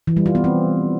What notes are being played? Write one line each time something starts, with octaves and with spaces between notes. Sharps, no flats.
E3
G3
F4
B3
C4